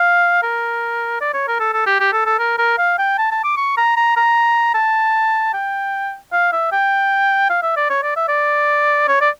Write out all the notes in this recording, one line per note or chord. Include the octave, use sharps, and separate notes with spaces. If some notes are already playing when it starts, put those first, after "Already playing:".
Already playing: F5
A#4
D5
C#5
A#4
A4
A4
G4
G4
A4
A4
A#4
A#4
F5
G5
A5
A5
D6
C#6
A#5
A#5
A#5
A5
G5
F5
E5
G5
F5
E5
D5
C#5
D5
E5
D5
C#5
D5